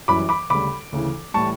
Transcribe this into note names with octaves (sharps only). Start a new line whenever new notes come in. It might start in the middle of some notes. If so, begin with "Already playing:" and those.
F#2 E3 G3 B5 D6
B5 D6
D2 C#3 G3 B5 D6
D2 C#3 E3
A2 E3 G3 A5 C#6